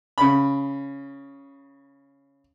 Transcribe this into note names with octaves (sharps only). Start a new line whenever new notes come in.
C#3 B5